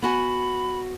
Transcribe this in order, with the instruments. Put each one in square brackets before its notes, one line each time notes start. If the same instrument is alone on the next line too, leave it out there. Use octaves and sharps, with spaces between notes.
[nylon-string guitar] B3 F#4 G#5 [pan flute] B5